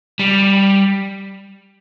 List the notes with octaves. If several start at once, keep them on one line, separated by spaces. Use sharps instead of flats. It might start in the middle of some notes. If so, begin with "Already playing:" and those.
G3